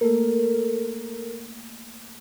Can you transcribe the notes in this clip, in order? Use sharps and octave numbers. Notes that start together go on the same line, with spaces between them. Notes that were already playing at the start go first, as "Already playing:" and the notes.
A3 A#3 A4 A#4